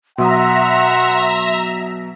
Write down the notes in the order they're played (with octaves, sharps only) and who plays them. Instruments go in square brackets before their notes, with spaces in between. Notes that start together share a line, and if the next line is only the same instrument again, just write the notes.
[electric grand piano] B2 F#3 D#6 [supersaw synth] E5 A#5 [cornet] F#5 [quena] C6